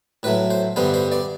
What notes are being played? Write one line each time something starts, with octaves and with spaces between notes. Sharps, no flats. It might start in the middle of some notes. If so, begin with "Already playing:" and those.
A2 F#3 A3 B4
C5
G2 D3 G3 B3 C5
C5
D5